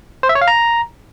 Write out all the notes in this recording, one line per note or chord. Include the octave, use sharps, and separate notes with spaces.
C5
E5
C#5
F5
A#5